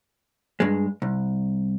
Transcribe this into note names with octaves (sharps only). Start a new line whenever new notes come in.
G2 G#3
C2